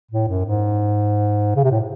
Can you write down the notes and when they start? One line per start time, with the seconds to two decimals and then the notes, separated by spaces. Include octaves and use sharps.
0.11 A2
0.28 F#2
0.46 G#2
1.56 C#3
1.64 C3
1.72 A2